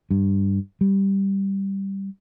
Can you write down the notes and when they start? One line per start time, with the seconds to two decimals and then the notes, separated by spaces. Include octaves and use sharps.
0.11 G2
0.81 G3